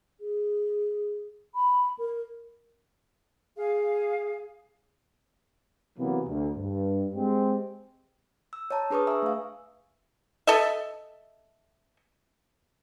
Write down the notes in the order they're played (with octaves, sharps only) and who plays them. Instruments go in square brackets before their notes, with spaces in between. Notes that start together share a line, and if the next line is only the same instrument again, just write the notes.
[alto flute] G#4
B5
A#4
[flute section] G#4 F5
[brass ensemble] C3 E3 F#3 A#3 B3
D2
G2
G#3 C4 G4
[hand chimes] E6
C#5 D#5 A5 A#5
D4 G#4 B4 C#6 D#6
E5 G#5 A#5 D#6 E6
A3 F5
[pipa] A4 D#5 E5